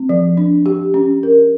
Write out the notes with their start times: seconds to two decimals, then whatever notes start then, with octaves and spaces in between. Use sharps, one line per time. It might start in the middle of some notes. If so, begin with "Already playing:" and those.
Already playing: C4
0.09 F3
0.37 D4
0.66 G4
0.94 C#4
1.23 A#4